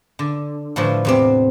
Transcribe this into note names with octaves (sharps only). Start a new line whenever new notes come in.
D3
A2 D3 E3 F3
E2 C3 C4